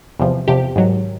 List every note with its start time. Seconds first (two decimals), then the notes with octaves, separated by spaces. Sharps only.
0.19 E2 C3 F3
0.48 E2 C3 F3 G4
0.76 G#2 D#3 F#3